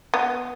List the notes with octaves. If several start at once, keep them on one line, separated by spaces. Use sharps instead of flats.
B3